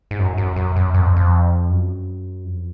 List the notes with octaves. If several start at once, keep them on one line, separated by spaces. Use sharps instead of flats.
G#2
F#2
F#2
F#2
F#2
F#2
F2
F2
F#2
F2